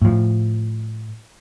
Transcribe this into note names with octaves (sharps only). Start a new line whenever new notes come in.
A2 F3